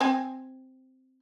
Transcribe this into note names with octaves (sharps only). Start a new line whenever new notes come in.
C4 G#5